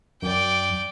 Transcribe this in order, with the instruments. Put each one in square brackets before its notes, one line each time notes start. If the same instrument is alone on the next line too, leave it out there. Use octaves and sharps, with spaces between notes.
[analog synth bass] F#2 [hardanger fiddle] D5 G5